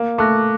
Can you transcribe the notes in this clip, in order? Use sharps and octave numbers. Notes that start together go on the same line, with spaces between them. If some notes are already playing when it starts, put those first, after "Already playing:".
Already playing: A#3
A3 D6 F#6 A#6